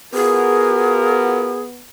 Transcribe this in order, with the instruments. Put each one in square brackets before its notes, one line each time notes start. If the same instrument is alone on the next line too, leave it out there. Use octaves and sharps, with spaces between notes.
[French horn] B3 [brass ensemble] F4 F#4 A#4 [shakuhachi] G#4